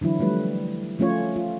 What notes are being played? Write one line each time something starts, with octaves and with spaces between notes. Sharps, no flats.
D3 E3 F#3 E4
F3 G3 A3 B4
F3 A3 C#4 F4 C#5
F4